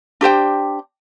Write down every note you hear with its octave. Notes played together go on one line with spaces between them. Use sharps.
D4 G4 C5 G5